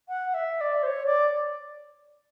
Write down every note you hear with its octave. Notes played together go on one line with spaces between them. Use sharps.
F#5
E5
D5
C5
C#5
D5